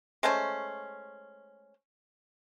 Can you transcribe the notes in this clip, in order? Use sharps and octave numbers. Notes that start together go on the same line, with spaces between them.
G#3 A3 C#4 C5